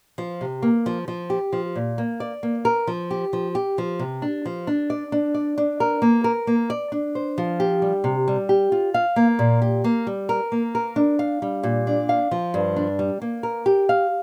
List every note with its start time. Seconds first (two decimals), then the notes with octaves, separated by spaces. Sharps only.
0.18 F3
0.41 C3
0.63 A#3
0.86 F3
1.08 F3
1.30 G4
1.53 F3
1.76 A#2
1.98 A#3
2.20 D5
2.43 A#3
2.65 A#4
2.87 F3
3.11 G4
3.33 F3
3.55 G4
3.78 F3
3.99 C3
4.22 D4
4.46 F3
4.67 D4
4.90 D5
5.12 D4
5.34 D5
5.58 D4
5.80 A#4
6.02 A#3
6.24 A#4
6.47 A#3
6.70 D5
6.92 D4
7.15 C5
7.38 F3
7.60 G4
7.82 G3
8.04 C3
8.28 G3
8.49 G4
8.72 F4
8.94 F5
9.16 A#3
9.39 A#2
9.62 G4
9.84 A#3
10.07 G3
10.29 A#4
10.52 A#3
10.75 A#4
10.96 D4
11.19 F5
11.42 G3
11.63 A#2
11.87 D4
12.09 F5
12.31 F3
12.54 G2
12.76 D4
12.99 G3
13.22 A#3
13.43 A#4
13.66 G4
13.89 F5